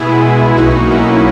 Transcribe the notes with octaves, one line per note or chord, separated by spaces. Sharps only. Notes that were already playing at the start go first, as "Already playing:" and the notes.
Already playing: B2 B3 E4 G#4
G#3
B3
C#2
B1 D#4 F#4
A#3
A#3 C#4 E4
A#3